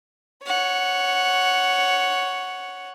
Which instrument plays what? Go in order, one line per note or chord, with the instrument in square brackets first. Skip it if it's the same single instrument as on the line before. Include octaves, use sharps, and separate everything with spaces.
[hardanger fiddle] C#5 F#5